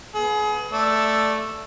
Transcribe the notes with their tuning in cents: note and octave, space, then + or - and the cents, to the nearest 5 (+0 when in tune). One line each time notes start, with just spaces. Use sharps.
B3 +0 G#4 +30
A3 +0 D5 +0 E6 +10